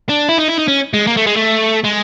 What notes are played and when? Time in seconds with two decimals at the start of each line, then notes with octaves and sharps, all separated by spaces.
0.09 D4
0.29 E4
0.38 D#4
0.48 E4
0.58 D#4
0.68 C#4
0.94 G#3
1.07 A#3
1.17 A3
1.27 G#3
1.36 A3
1.84 G#3